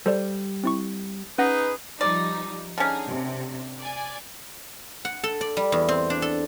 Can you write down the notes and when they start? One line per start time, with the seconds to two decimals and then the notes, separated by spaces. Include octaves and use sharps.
0.06 G3 A4 C5 D5
0.64 C4 E4 C#6
1.38 C#4 D#4 G#4 B4 F#5 A#6
2.01 F3 G3 D#4 D5
2.78 D3 C#4 D#4 G#4
3.07 C3
3.80 D5 G#5
5.05 F#5
5.24 A4
5.41 D5
5.57 G3
5.72 E2
5.89 C4
6.10 D4
6.22 A4